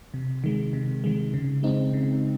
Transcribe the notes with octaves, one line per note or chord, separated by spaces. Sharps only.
C3
D#3 G#3
C3
D#3 G#3
C#3
G#3 C4 D#4
C#3